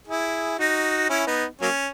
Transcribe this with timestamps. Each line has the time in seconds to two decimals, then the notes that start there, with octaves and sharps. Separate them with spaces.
0.07 E4 G#4
0.58 D#4 F#4
1.10 C#4 E4
1.27 B3 D#4
1.61 F#3 A#3 C#4